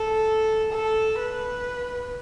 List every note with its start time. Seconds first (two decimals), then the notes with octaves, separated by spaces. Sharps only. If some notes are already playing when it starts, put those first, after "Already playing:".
Already playing: A4
0.72 A4
1.20 B4